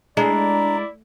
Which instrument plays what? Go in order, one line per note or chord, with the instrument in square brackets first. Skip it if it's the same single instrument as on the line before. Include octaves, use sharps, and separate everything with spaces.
[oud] G#3 [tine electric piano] D4 [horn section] E4 D5 [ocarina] A#5